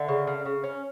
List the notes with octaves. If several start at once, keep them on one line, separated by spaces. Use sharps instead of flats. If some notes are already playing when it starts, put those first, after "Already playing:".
Already playing: D3 E5
C#3
C#3
C#3
C#4